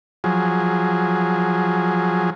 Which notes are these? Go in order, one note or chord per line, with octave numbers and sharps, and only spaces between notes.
F3 F#3 G#4